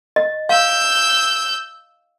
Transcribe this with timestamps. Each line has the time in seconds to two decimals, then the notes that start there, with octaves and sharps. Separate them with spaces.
0.16 D#5
0.49 F5 E6 G6